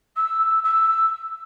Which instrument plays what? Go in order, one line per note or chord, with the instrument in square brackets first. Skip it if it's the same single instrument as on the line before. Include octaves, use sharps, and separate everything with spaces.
[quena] E6
E6